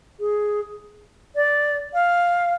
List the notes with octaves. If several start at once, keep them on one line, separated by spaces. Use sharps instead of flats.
G#4
D5
F5